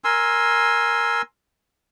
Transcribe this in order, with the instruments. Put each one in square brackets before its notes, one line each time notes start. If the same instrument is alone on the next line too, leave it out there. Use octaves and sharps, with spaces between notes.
[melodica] A#4 G#5 C6 E6